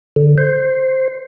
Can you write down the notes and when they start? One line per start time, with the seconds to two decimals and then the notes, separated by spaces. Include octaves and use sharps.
0.16 D3
0.38 C5